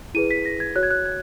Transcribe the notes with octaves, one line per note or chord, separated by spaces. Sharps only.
E4 G#4 B4 D#7
B6
A#6
G#6
F#4 C#5 F#6
G#6
F#6
G#6